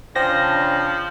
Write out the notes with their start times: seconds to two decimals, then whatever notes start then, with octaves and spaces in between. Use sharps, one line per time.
0.16 C#3 F3 D4 C5 G5 A#6